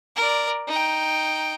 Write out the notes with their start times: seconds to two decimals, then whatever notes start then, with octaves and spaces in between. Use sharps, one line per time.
0.16 A#4 D5
0.68 D#4 G5